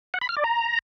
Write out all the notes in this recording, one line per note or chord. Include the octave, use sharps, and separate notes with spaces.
F#5
B5
F6
D5
A#5